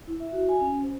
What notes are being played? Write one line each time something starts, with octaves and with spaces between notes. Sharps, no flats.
E4
E5
F#4
G#5
C#4
C5